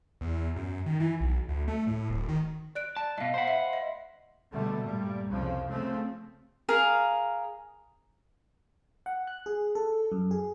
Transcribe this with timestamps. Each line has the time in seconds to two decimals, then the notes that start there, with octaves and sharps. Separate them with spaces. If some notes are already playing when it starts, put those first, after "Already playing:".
0.21 E2
0.56 F#2
0.86 D#3
1.00 E3
1.20 B1
1.49 D2
1.68 A3
1.87 A2
2.10 D1
2.29 D#3
2.75 D5 F#6 D7
2.97 A5
3.18 G#2 B2 D#5 F5
3.34 C5 F#5 B5 B6
3.48 E5
3.73 D#5
4.52 B2 D3 G3 A3
4.82 G2 A#2 G3
5.29 C2 F2 C#3 F3
5.69 C#3 F3 A3 C4
6.69 G#4 A#4 F5
9.06 F#5
9.27 F#6
9.46 G#4
9.75 A4
10.12 F#2
10.31 G#4